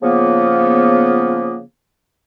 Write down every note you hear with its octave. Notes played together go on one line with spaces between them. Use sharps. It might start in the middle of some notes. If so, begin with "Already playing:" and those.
C#3 F3 A#3 B3